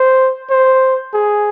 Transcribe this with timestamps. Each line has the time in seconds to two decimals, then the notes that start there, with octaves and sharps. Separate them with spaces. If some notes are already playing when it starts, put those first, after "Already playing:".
Already playing: C5
0.50 C5
1.14 G#4